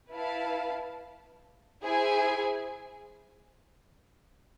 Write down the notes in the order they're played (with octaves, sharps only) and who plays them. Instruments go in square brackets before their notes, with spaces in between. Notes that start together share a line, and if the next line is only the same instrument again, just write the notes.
[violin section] E4 B4 F5 A5
E4 G#4 C5 G#5